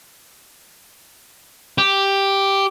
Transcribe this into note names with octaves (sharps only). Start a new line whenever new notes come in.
G4